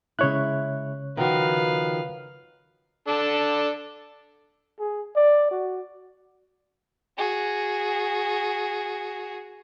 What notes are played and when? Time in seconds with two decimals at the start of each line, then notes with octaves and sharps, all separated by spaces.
0.19 C#3 G#3 E4 C#5 F#6
1.17 D#3 F3 F#4 B4 F5
3.08 D4 A4
4.79 G#4
5.16 D5
5.51 F#4
7.18 F#4 G#4